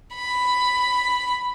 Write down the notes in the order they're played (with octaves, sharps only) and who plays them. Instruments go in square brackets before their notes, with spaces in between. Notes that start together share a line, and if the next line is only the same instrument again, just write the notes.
[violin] B5